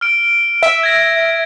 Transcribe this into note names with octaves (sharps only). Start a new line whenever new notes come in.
F6 D7
E5
G#6 A#6